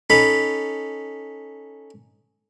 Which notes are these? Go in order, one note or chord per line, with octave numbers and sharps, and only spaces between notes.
C#4 D#4 A4 B5